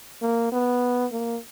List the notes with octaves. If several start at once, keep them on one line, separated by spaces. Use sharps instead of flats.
A#3
B3
A#3